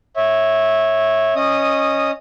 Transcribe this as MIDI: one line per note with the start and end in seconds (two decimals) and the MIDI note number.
0.16 1.34 73
0.16 1.34 76
1.36 2.11 61
1.36 2.11 75
1.36 2.11 87